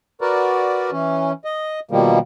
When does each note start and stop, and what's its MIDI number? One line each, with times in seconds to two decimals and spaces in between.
0.21 0.90 66
0.21 0.90 70
0.21 0.90 71
0.21 0.90 74
0.92 1.32 52
0.92 1.32 61
1.45 1.80 75
1.91 2.19 47
1.91 2.19 51
1.91 2.19 53
1.91 2.19 55
1.91 2.19 58